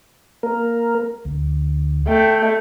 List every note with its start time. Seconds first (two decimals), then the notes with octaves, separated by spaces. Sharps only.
0.43 A#3 A#4
1.25 D2
2.07 A3 G5